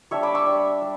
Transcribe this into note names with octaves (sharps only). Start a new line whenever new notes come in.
G3 D4 C#5 E5
B5 D6
C#6 E6
G3 D4
G3